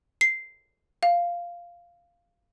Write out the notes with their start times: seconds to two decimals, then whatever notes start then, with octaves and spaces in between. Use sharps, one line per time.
0.21 C7
1.03 F5